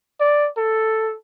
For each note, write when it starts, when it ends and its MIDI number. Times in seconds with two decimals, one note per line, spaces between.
0.20 0.49 74
0.57 1.16 69